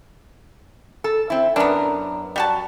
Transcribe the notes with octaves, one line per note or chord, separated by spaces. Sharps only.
A4
C4 E4
F#2 B3 D4 A#4 A#5
G3 F#4 A5